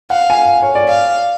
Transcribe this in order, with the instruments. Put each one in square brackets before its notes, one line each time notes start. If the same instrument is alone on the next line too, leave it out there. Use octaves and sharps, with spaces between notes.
[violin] F5 [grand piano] F#5
[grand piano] G#5
C#5
D5
[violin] F5